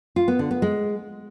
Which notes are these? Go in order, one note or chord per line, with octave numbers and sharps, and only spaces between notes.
F4
B3
D3
B3
G#3